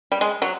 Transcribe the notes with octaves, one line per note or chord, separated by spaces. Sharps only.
G3
G#3
F#3